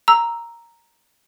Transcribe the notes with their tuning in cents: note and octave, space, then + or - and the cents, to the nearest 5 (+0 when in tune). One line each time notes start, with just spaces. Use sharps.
A#5 +0 E6 +0